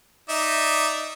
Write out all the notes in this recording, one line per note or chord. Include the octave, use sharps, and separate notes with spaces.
D#4 D5 E5